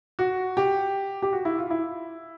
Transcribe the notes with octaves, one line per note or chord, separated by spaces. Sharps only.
F#4
G4
G4
F#4
E4
F4
E4